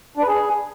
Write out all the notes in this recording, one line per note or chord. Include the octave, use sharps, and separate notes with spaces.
D4
B4
G#4